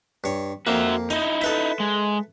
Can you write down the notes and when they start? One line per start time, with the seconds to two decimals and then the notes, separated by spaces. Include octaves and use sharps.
0.24 G2 C#5
0.67 F2 A#3 F#4 E5
1.10 D#4 E4 D#5
1.41 A4 B4 E5
1.80 G#3